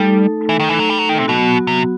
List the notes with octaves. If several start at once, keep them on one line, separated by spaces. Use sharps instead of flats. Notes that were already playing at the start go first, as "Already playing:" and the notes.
Already playing: G3 A3 D#4 A4
E3
D#3
E3
F#3
G3
F#3
D#3
C3
B2 F#3 B3 F#4
C3